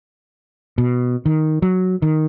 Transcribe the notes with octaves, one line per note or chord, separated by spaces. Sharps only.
B2
D#3
F#3
D#3